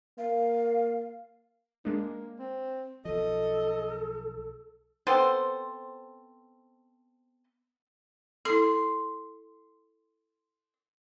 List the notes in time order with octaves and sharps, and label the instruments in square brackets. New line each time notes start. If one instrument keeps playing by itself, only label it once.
[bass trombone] A#3 [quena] F5
[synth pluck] G#3 D4 [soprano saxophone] A#3
[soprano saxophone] C4
[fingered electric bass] B1 F3 [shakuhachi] A4 [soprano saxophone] D#5
[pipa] B3 C4 A4 C5
[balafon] E4 A4 [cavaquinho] C6